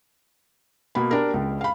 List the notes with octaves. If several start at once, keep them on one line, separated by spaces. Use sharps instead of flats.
B2 A#3 B5
D4 G4 A#4
C#2
F5 B5